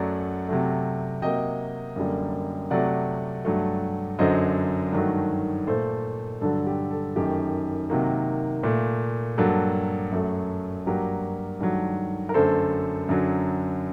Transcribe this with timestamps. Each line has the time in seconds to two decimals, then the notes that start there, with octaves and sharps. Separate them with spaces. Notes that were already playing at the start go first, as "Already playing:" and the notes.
Already playing: F#2 F#3 A3 D5 F#5
0.49 C3 F#3 A3
1.22 C3 F#3 A#3 D#5 G5
1.96 F#2 D3 G3 A#3
2.70 C3 F#3 A3 D5 F#5
3.45 G2 F#3 A3
4.19 F#2 D3 F#3 C5 D#5
4.93 G2 D#3 F#3 A3
5.67 A#2 A3 A4 C5
6.41 G2 D3 F#3 A4
6.66 G4
6.91 A4
7.16 F#2 D#3 A3 G4
7.90 C3 D#3 F#3 A#3
8.63 A#2 A3
9.38 G2 F#3 A#3 A4
10.12 F#2 F#3 A3
10.86 G2 F#3 A#3 G4 A#4
11.61 G2 D#3 F#3 A3
12.29 A#4
12.34 F#2 D3 A3 A4 C5
13.09 F#2 D3 F#3